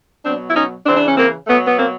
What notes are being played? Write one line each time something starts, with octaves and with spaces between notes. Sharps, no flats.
B2 F#3 C4 D4
E4
C#4 D#4
C#3 E3 C4 D4
D4
C#4
A#3 C4
B2 F#3 A3 B3
B3
A#3 C4